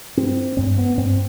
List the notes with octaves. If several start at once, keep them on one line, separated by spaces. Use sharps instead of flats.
G2 C4
G2 C4
B3
G2 C4